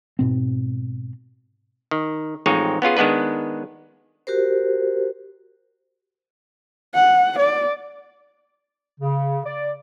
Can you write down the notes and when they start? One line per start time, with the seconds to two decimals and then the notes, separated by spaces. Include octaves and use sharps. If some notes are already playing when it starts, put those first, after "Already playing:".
0.19 G#2 B2 C4
1.91 D#3
2.46 A1 F3 G#3 C4 D#4 C#5
2.82 B3 C#4 F4 G#4
2.97 D#3 G#3 B3 D4 B4
4.27 F#4 G4 A#4 C5
6.94 F#5
7.39 D5
9.01 C#3
9.46 D5